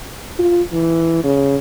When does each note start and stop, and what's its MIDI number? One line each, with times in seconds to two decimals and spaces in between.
0.39 0.61 65
0.72 1.20 52
1.24 1.56 49